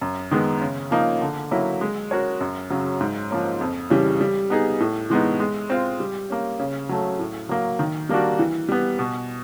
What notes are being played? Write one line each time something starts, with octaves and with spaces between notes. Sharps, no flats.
F#2
D#3 G#3 B3
C#3
F3 A#3 D#4
D3
F#3 A#3 C#4 E4
G#3
C#4 F#4 A#4 C#5
F#2
C#3 F#3
G#2
F3 A#3 C#4
F2
C#3 E3 G3
G3
B3 D#4 G#4
A2
E3 G#3 B3 D#4
G#3
C4 F4
G3
A#3 C#4
C#3
F#3 A3
A2
F#3 A#3
D#3
G3 A#3 D4 F#4
E3
G3 B3
B2